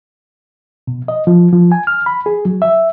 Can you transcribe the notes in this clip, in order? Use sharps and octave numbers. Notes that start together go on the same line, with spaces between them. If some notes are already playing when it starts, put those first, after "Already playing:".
B2
D#5
F3
F3
G#5
F6
B5
G#4
F#3
E5